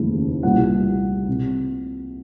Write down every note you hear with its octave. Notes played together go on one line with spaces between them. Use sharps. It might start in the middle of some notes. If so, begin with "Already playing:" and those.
Already playing: F1 D#2 C#3 E3
C2 A#2 F#5
C3